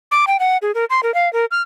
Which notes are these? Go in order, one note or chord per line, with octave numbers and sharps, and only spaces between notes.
D6
G5
F#5
G#4
A#4
C6
A#4
F5
A#4
F6